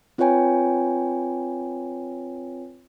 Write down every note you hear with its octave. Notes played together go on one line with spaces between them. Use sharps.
C4 F4 B4 C#5 G5 G#5